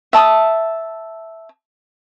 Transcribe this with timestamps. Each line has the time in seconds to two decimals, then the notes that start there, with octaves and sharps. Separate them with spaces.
0.13 E5 A5 D#6